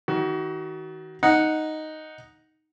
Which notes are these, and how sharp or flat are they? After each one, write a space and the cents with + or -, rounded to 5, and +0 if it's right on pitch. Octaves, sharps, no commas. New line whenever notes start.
D#3 +35 F#4 +30
D#4 +0 F#5 -5